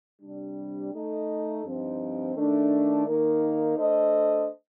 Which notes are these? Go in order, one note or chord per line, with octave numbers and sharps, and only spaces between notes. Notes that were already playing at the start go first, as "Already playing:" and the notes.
C3 G3 D4
A3 D#4 A4 D#5
G2 F3 C4 D#4
D#3 A3 D4
D#3 A#3 D#4 A#4
A3 D4 A4 C5 D#5